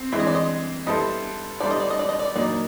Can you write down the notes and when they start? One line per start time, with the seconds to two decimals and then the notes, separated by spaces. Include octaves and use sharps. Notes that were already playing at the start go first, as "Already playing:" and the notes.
Already playing: C4
0.12 E3 G#3 C4 E5
0.20 D#5
0.27 D5
0.35 D#5
0.87 G3 B3 E4 A4 C5 D#5
1.60 G3 B3 E4 A4 C5 D5
1.71 D#5
1.80 D5
1.90 D#5
1.99 D5
2.09 D#5
2.19 D5
2.35 A#2 F#3 A#3 D#4 D5